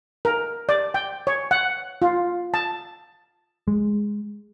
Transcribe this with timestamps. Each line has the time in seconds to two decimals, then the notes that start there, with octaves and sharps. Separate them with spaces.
0.25 A#4
0.69 D5
0.94 G5
1.27 C#5
1.51 F#5
2.02 F4
2.54 A5
3.68 G#3